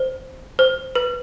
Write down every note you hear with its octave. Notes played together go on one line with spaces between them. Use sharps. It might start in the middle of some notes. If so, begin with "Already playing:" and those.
Already playing: C5
C5
B4